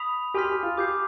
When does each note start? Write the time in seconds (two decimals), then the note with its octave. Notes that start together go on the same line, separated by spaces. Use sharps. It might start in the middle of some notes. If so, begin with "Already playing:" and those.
Already playing: B5 D#6 B6 F7
0.34 G4 G#5 C6 F6 B6
0.50 G4
0.63 F4
0.77 G4 D6 G6 C7